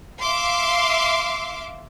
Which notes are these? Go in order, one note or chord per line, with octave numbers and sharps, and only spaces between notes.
E5 F5 C6 D6